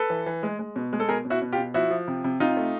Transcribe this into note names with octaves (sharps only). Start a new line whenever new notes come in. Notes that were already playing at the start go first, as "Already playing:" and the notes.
Already playing: A4 B4
E3
E3
G#3
G#3
B2
G#3
A4
B2 G#4 A#4
B2
E4 F#4
B2
F4 G4
B2
F3 E4 F#4
F3
C3
C3
C3 D#4 F4
A3